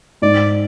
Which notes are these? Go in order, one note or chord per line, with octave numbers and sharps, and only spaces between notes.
G#2 D5